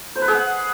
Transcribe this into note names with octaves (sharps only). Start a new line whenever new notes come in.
C5
B4
G#4
F#5